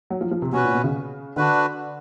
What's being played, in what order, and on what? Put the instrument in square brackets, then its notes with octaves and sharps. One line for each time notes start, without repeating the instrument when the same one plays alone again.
[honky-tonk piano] F#3
F3
F3
C3
[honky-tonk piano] B2 [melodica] C#4 F#4 B4
[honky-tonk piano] A#2
B2
C#3
[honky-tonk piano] D3 [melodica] D4 F#4 B4